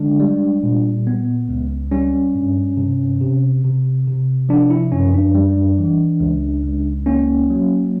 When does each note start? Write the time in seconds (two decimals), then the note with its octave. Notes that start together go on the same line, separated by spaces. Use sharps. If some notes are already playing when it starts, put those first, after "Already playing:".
Already playing: D3 G#3 D4
0.20 G3
0.63 A#2
1.07 B3
1.49 C#2
1.91 G3 C#4
2.35 G2
2.77 C3
3.21 C3
3.64 C3
4.07 C3
4.49 F3 D4
4.70 E4
4.92 F#2 C#4
5.14 D4
5.35 G3
5.78 E3
6.20 C#2
6.64 C#2
7.06 A#3 C#4
7.50 F#3